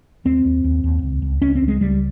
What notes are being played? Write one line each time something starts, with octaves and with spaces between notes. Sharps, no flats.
D#2 C4
D#2
D#2
D#2
C#2
C#2
C#2 C#4
C4
C#2
G#3
C#2 G3